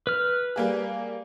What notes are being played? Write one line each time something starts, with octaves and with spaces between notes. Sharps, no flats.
B4 F6
G3 A#3 G#4